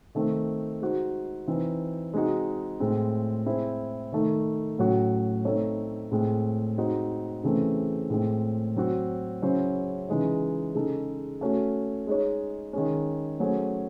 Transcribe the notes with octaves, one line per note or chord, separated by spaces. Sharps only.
D#3 A3 C4
G#3 D#4 F#4 C5
E3 C4 D#4
G#3 C4 D#4 F#4
A2 G#3 C4 E4
G#3 C4 E4 G#4 C5
D#3 A3 D#4
A2 F#3 C#4 F#4
A3 C4 D#4 A4 C#5
A2 G#3 C4
G#3 C4 D#4 F#4 C5
C#3 E3 A3 C4
A2 G#3 C4
F#3 C4 F#4
C#3 F#3 C#4 E4 C5
C#3 E3 G#3 D#4
C#3 G#3 D#4 A4
A3 C#4 F#4
G#3 D#4 G#4 C#5
D#3 G#3 C#4
F#3 A3 C#4 G#4 C5